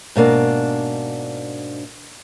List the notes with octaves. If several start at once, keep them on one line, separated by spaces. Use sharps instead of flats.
G#2 B2 A#3 D4